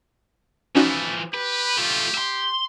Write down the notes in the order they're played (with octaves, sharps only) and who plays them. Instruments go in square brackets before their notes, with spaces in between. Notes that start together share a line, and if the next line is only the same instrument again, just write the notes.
[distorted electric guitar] E3 F3 [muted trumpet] A3 [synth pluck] C#4 D#4 F#4
[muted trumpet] G4 [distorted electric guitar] B4
[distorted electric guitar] A3 F4
E5 C6